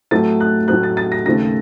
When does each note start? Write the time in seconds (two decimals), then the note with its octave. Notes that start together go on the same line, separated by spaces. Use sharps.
0.11 A2 F#3 A3 C4 A6
0.40 F#6
0.68 A2 F#3 A3 C4 F#6
0.83 A6
0.97 A6
1.12 A#6
1.26 D#2 C#3 A3 C4 A#6